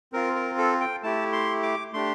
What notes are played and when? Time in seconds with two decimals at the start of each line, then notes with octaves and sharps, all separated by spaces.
0.13 C4 F4 A#4
0.35 A#4
0.58 A4
0.80 G5
1.03 A3 E4 G4 A5
1.32 C6
1.63 D6
1.93 A3 D4 G4 C6